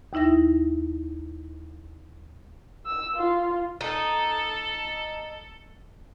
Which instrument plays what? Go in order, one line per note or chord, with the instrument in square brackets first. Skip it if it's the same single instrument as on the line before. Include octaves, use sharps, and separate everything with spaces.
[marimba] D#2 D#4 E4 E5 A#6
[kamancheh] E6
F4
[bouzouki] D#4 [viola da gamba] A4